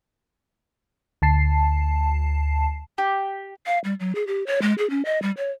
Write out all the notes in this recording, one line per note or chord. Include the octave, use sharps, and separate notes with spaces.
D2 A5 C7
G4
F5
G3
F#3
G#4
G4
C#5
G#3
G#4
C#4
D#5
G3
C#5